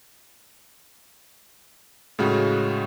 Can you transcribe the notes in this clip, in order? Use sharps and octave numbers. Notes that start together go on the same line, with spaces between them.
A2 C#3 G#3 F#4